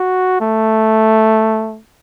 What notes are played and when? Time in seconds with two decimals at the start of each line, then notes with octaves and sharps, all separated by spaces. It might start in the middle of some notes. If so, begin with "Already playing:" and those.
Already playing: F#4
0.41 A3